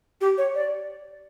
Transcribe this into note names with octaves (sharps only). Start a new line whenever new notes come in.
G4
C#5
D5